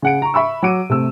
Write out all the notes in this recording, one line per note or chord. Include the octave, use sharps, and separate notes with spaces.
C#3 F#5 D7
A#5 C#6
E5 B5 C#6 E6
F#3 F#5 D6 D7 D#7
C3 A3 E6